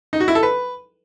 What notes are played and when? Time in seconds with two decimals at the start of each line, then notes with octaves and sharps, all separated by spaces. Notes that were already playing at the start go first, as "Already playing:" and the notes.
0.13 D#4
0.20 F#4
0.28 E4
0.35 A4
0.43 B4